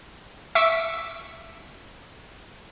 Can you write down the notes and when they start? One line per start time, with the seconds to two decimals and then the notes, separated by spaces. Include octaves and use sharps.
0.55 E5 C#6 D6